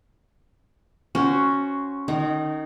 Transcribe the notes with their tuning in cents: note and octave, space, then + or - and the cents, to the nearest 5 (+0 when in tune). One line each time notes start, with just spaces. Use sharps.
C#4 +0 F#4 +5 C5 -10
D#3 -30 D#4 +0